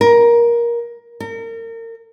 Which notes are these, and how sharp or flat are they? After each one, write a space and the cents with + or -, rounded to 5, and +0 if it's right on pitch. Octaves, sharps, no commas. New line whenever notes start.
A#4 +15
A#4 -35